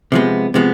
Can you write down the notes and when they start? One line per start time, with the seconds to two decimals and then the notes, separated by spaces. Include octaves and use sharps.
0.12 C3 F3 G#3 B3
0.54 C3 F3 G#3 B3